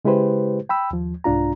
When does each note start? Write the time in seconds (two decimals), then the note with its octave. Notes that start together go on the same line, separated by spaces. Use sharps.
0.05 C#3 G#3 E4 G4 B4 C5
0.69 G5 B5 E6
0.91 D#2 F3
1.24 C2 G#2 D4 F4 A#5